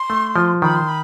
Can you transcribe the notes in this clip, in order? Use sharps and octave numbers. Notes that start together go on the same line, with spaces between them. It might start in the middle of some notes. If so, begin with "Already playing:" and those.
Already playing: C6
A3
F3
D#3 B5
C6
B5